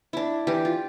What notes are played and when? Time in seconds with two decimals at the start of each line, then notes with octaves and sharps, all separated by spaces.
0.13 D4 E4
0.47 E3 G4
0.65 F4